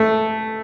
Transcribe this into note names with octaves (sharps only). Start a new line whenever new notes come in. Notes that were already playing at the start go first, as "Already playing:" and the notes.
Already playing: A3